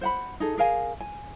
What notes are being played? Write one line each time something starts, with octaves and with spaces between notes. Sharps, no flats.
C5 F#5 B5
D#4 G#4 A4
G#4 A#4 F5 G#5
G#5